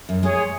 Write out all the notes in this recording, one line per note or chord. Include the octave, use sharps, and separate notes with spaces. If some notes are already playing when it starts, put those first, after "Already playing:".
F#2
G#3 G#4 C#5